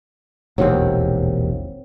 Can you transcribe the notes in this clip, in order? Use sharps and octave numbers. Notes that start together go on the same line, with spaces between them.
E1 A#1 D#2 F#3 C4